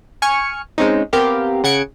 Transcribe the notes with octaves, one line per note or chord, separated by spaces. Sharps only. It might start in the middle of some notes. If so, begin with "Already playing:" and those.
G#5 C#6 F6 C#7
G#3 C4 C#4 D#4
B3 C4 G4 A#4 F5
C#3 F#5 G#6 C#7 D7